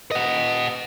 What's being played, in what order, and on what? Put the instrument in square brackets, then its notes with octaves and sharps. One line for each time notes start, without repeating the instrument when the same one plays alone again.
[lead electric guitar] D#5 F#5